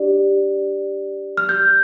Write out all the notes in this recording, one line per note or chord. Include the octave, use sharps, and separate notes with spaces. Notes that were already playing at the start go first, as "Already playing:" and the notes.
Already playing: D4 G4 D5
F6
G6